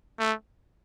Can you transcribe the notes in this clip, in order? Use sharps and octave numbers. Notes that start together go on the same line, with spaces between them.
A3